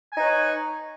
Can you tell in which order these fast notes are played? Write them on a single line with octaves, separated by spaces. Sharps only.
G#5 D#4 B4 C#5